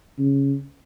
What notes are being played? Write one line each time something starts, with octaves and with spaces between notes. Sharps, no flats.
C#3